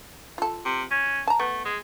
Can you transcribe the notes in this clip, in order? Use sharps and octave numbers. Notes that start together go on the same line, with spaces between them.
F4 A4
C3
C#4
A5 A#5
A3 B3
G#3